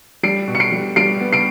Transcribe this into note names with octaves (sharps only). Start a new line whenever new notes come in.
G3 C7 D7
B2
C#7
C7 D7
G3
G3 C7 D7
B3
C7 D7